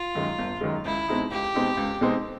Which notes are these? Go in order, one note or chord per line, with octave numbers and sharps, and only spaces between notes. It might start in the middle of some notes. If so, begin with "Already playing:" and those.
Already playing: F4
F#2 D#3 G#3
G1
F#2 D#3 G#3
C#2 E4
B2 G#3 C4 D#4
C#2 G4
B2 G#3 C4 D#4
C#2
B2 G#3 C4 D#4